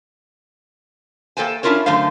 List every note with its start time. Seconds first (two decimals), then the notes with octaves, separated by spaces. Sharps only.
1.37 A#3 A4 C5 G5 G#5
1.63 C#4 D4 E4 F4 A#4 C#5
1.86 F#2 D3 A3 C5 F5